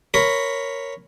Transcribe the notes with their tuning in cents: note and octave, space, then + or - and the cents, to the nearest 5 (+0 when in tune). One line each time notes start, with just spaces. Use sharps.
A#4 +0 C#5 +0 B5 +10